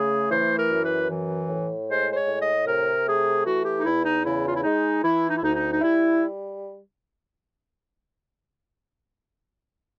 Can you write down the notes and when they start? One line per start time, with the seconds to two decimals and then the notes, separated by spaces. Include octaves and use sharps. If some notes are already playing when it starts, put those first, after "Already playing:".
Already playing: C#3 A3 G#4
0.31 E3 C5
0.58 A#4
0.70 F#2
0.84 B4
1.10 E3
1.49 A2
1.89 G#3 C5
2.11 C5
2.15 C#5
2.28 A2
2.41 D#5
2.67 C3 A#4
3.06 A3 G#4
3.45 E3 F#4
3.65 G4
3.77 D#4
3.85 E2 E4
4.05 D#4
4.24 C#3 E4
4.48 F4
4.55 E4
4.63 G#3 D#4
5.03 E3 E4
5.29 D#4
5.36 E4
5.42 D2 D#4
5.55 D#4
5.72 D#4
5.82 G3 E4